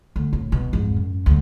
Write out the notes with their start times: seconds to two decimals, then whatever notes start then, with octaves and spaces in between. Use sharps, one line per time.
0.16 D2
0.33 A2
0.52 B2
0.73 F2 G#2
0.97 F#2
1.26 D2 G3